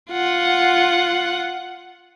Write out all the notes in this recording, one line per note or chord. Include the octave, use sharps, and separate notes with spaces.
F4 F#5